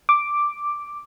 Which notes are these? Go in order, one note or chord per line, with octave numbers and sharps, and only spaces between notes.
D6